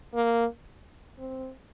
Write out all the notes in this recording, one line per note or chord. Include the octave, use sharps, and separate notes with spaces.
A#3
C4